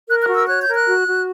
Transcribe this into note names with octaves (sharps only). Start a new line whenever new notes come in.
A#4 F#6
F#6
F#4
E6
C#5 F#6
G6
A#4
F#6
F#4
F#4